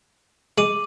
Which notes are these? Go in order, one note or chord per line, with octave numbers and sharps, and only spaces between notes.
G#3 D6 D#7 F#7